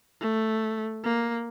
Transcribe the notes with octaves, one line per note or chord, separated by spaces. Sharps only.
A3
A#3